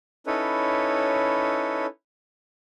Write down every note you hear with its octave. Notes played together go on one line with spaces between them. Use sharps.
C#4 D#4 E4 A4 B4 C#5